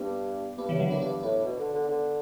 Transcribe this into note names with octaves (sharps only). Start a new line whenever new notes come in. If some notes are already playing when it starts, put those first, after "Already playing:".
Already playing: G2 B3 D4
G2 B3 D4
C#3 E3
G2
D3 F#3
F#2 B3 D4
G2 B3 D4
A2 B3 D4
B2
D3
D3
D3